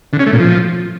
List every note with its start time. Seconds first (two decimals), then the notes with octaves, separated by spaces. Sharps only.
0.13 D3
0.19 C#4
0.26 A3
0.33 A#2
0.39 F3